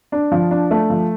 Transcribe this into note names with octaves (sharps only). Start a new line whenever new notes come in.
D4
F3
D4
A3
F3